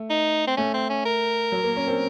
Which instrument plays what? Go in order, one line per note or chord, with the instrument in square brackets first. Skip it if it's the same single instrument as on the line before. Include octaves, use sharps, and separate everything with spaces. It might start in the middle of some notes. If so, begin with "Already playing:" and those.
Already playing: [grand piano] A3
[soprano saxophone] D#4
C4
[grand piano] A3 [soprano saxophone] C#4
[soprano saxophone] C4
C#4
A#4
[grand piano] F#3
A#3
C#4
C4